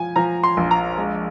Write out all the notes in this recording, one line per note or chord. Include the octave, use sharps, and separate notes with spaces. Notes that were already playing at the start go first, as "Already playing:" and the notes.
Already playing: F3 G#5
F3 A#5
C6
A#1
A#5
G#3